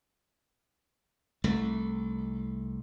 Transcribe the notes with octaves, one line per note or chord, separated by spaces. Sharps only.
C2 A3